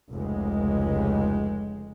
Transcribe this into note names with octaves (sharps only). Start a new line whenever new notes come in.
F1 C#2 G#3